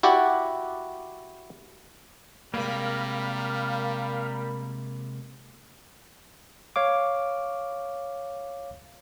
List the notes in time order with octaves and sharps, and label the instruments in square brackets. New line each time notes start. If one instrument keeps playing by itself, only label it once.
[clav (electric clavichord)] E4 F#4 G4 D5 F#5
[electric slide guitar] C3 G#3 A#3 [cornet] G3 [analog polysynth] A#4 B5 [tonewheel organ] F5
[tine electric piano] C#5 F5 D6